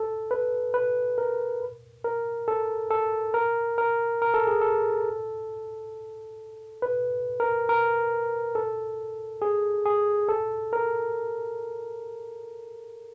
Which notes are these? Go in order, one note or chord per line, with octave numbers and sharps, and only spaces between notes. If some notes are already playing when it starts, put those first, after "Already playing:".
Already playing: A4
B4
B4
A#4
A#4
A4
A4
A#4
A#4
A#4
A4
G#4
A4
B4
A#4
A#4
A4
G#4
G#4
A4
A#4